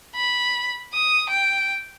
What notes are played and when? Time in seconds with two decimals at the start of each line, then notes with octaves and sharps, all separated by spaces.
0.15 B5
0.93 D#6
1.30 G5